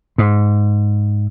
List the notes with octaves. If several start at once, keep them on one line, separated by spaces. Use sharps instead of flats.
G#2